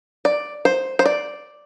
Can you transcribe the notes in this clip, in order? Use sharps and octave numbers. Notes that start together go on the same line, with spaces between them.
D5
C5
C5
D5